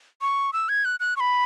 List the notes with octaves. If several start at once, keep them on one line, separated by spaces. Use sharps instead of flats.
C#6
E6
G#6
F#6
F#6
C#6
B5